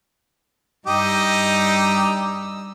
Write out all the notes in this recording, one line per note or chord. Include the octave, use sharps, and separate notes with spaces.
G2 D#4 G4 D#5 E6